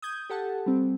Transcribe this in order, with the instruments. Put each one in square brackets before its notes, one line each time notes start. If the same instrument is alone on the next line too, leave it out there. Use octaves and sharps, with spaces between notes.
[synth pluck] D#6 G6 G#6
G4 A4 F#5 A5
G3 C4